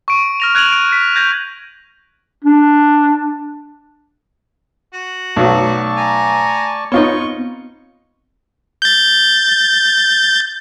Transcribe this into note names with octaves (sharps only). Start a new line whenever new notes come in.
C#6 D7
F6 A#6 F7
F#6 G#6 D7 D#7 F7 F#7
D7 D#7
B6
G6 G#6 A#6
D4
F#4
B1 F#3 A3 D5 A5 C#6
G#5 A#5
B3 C4 D#4 F4 C#5 C#6 G7
G6 A6